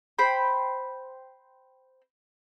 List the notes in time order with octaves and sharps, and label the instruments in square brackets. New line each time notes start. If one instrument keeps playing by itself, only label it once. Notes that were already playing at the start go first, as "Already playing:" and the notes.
[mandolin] C5 G5 B5